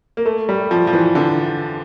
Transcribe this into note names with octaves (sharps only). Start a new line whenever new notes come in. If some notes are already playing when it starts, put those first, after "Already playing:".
A#3
A3
G3
F3
F3
E3
D3